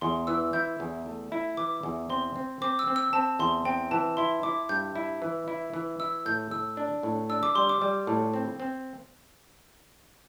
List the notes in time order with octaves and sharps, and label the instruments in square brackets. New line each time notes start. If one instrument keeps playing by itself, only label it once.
[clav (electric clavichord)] E2 [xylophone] C6
[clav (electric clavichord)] E3 [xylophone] E6
[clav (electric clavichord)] E4 [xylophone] G6
[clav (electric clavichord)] E2
A3
E4
[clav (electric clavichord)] E3 [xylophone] D6
[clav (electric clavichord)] E2
[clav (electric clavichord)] C4 [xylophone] C6
[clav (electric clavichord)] C4
[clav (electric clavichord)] C4 [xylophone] D6
[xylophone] E6
[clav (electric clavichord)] C4
[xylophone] E6
[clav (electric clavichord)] C4 [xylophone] A5
[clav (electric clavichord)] E2 [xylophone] C6
[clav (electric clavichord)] C4 [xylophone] G5
[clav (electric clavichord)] E3 [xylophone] A5
[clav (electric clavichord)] E4 [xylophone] C6
[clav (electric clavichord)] E4 [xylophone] D6
[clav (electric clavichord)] G2 [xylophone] G6
[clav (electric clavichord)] E4
E3
E4
E3
[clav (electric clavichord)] E4 [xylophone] E6
[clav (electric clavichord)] A2 [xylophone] G6
[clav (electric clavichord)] A2 [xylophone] E6
[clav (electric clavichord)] D4
A2
[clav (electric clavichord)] D4 [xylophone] E6
[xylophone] D6
[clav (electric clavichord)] G3 [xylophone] C6
[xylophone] D6
[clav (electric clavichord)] G3
A2
C4
C4